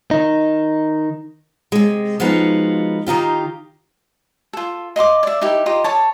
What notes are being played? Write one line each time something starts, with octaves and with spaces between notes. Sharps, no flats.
D#3 D#4
C3 G#3
F3 G#3 B3 D#4 F4 F#4
D#3 D#4 F4 G4
F4 A4
D#5 F5 C6 D6
D5 E5
D#4 E4 G4 A#4
F4 G4 D#5 A#5
A4 C#5 A5